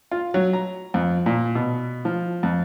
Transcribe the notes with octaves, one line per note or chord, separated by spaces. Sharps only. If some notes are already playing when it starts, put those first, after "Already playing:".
F4
F#3
A#5
F2
A#2
B2
F3
F2